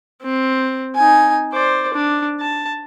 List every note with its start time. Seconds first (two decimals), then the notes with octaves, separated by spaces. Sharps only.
0.23 C4
0.95 D#4 G#5
1.53 C5 D5
1.94 D4
2.40 A5